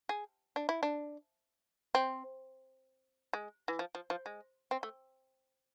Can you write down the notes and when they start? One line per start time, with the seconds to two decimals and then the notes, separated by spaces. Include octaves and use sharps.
0.09 G#4
0.56 D4
0.69 E4
0.83 D4
1.95 C4
3.33 G#3
3.68 E3
3.79 F3
3.95 F3
4.10 F3
4.26 G#3
4.71 C4
4.83 A3